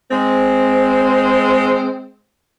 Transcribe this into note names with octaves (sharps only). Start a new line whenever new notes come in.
G#3 C4